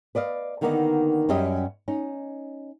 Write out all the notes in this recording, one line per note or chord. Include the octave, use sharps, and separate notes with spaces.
B4 D5 D#5 F5
D3 D#3 A#3 B3 C#4 D#4
F#2 F#3 G3 C#4 G4 D#5
C#4 D#4